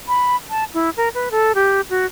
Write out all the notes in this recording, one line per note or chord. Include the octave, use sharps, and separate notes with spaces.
B5
A5
E4
A#4
B4
A4
G4
F#4